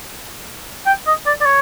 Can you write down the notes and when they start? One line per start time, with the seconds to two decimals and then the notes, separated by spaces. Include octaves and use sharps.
0.86 G5
1.07 D#5
1.26 D5
1.41 D5
1.46 C#5